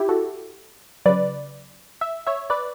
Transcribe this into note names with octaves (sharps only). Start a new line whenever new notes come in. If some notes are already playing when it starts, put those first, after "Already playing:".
Already playing: E4 G4
F#4 A4
C#3 F#3 B4 D5
E5
C#5 E5
B4 D5